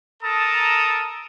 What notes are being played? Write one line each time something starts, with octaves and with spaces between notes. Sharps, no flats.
A4 A#4 A5 A#5 D#6